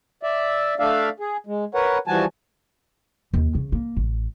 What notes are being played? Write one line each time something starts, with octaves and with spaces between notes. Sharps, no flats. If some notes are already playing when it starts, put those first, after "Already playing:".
D5 E5
A3 D4 D5 E5 F5
G#4
G#3
A#4 B4 C#5 F#5
E3 F3 G3 F#4 G#5 A5
D#2
C#3
A#3
A1